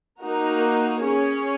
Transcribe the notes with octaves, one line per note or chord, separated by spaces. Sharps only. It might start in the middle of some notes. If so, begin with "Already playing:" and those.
A#3 D#4 F#4 A#4
C#4 G#4 C#5